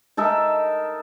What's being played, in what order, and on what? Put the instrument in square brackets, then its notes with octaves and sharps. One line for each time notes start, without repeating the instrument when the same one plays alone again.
[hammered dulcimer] D#4 A4 A#4 E5